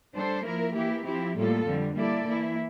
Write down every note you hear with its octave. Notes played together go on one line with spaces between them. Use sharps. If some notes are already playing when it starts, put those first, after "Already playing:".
G3 D4 A4 C5
F3 A#3 E4 A#4
E3 A#3 E4 G4
F3 C4 E4 G4
A2 G3 A#3 F4 A4
F2 D3 G3
G3 A#3 E4 A4 D5
E3 A#3 E4